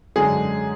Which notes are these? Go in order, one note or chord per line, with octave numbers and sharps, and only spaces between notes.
F#2 D3 G#3 G#4